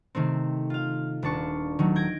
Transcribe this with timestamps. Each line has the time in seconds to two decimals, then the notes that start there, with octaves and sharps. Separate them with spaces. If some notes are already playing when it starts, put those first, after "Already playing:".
0.15 C3 D#3 A3 C4
0.70 F4 F5
1.22 D#1 D4 A5 C#6
1.79 D#3 F#3 A3
1.96 G6 G#6 A#6 D7